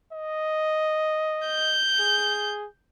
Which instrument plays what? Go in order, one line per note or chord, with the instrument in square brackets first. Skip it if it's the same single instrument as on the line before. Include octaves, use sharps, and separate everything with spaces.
[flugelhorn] D#5
[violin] G6
[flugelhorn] G#4